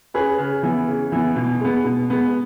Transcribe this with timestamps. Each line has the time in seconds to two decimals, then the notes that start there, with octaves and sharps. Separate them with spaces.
0.14 C#4 G#4 B4
0.38 C#3
0.63 E3 B3
0.88 C#3
1.12 E3 B3
1.36 B2
1.61 G#3 B3
1.84 B2
2.10 G#3 B3